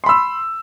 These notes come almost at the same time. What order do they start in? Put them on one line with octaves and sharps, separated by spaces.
C6 B5 E6